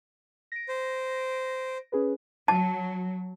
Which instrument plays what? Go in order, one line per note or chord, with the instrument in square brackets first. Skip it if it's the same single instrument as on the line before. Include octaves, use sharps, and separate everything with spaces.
[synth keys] A#6 D7
[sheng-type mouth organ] C5
[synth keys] C#4 G#4 B4
[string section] F#3 [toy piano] A5